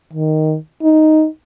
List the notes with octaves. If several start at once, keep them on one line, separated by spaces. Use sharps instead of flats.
D#3
D#4